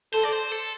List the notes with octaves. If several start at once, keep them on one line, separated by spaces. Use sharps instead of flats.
A4 C5
D5
C5
A4